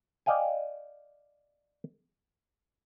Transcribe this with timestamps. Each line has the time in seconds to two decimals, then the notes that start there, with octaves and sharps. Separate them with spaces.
0.26 D5 D#5 F5 G5 G#5